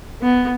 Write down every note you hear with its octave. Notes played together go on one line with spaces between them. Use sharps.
B3